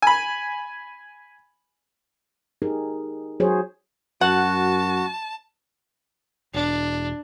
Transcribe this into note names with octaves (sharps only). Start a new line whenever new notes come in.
G#5 B5
D#4 G4 G#4 A#4
F#3 F#4 G#4 C5 C#5
F#2 F#4 F#5 A5
E1 D4